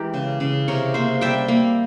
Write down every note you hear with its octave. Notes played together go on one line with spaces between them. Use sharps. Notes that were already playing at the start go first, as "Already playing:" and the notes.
Already playing: E3 G#3 G4 A#4
C#3
C#3
C3 A#4 C#5
A#3 C5 E5
G3 E5 G5
A#3